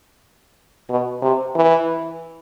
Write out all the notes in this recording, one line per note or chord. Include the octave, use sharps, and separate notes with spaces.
B2
C3
E3